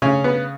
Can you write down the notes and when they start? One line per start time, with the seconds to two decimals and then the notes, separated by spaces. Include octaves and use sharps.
0.02 C#3 C#4
0.24 B3